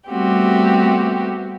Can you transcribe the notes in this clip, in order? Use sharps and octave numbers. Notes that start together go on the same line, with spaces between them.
G3 A3 B3 C4 F#4 G4